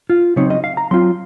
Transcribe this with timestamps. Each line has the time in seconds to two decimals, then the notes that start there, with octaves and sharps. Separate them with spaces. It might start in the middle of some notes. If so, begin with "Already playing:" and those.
0.10 F4
0.36 C#3 F#3 C4 D#4 C#5
0.50 D#5
0.64 F5
0.77 A#5
0.91 F#3 C4 F4 C6